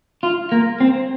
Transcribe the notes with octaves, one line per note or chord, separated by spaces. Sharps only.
F4
A#3
C4